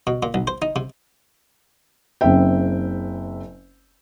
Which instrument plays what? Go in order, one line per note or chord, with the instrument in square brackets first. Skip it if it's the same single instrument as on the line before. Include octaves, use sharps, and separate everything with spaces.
[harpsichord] B2
A#2
B1
C5
D#4
C3
[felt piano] F#1 C#3 C4 E5 G5